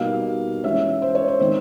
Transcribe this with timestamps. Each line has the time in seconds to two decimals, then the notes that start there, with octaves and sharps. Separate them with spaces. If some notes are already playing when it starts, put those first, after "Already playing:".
Already playing: B2 G3 A#3 D#4 F5
0.64 E3 G#3 C#4 E5
1.02 C5
1.15 C#5
1.28 C5
1.40 D#3 G#3 C4 D#4 C5